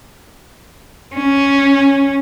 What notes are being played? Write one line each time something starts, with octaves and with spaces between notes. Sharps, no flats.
C#4